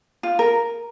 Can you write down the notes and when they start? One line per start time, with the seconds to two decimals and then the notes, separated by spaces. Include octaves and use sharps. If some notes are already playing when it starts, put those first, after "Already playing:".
0.23 F4
0.39 A#4